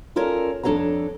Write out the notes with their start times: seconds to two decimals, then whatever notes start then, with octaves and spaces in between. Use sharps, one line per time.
0.16 C#4 F4 A4 A#4 C#5 D5
0.63 F2 D4 A4 C#5 F5 A#5